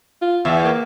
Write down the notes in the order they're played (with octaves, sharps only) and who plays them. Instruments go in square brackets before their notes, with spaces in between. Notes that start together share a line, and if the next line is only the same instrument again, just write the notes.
[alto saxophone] F4
[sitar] E2 [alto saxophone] E5
[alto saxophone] A#3